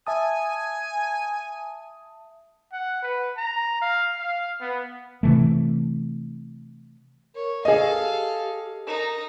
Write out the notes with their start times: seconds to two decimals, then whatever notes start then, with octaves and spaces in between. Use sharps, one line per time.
0.07 E5 G#5 A5 D#6
2.73 F#5
3.02 B4
3.37 A#5
3.82 F5
4.19 F5
4.61 B3
5.23 C3 E3 A3
7.35 A#4 C#5
7.65 G#4 A4 D#5 F5
8.01 G4
8.87 D#4 A#4 A#5